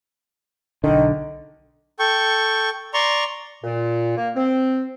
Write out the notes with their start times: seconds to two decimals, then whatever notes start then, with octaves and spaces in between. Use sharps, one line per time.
0.84 B1 D3 D#3
1.99 A4 G5 C#6
2.94 D5 A#5 C6 C#6
3.64 A#2
4.17 A#3
4.36 C4